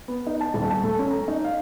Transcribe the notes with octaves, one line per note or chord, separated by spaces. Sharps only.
B3
D#4
A5
D#1
A5
A3
C#4
A#5
D#4
F5